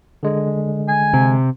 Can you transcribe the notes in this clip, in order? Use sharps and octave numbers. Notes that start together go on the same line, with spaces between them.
D3 G#3
G#5
C3